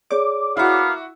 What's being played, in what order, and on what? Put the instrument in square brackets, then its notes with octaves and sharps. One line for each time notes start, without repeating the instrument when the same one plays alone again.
[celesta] G#4 C#5 D5 [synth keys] D6
[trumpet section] A#3 B3 F5 [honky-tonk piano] E4 F#4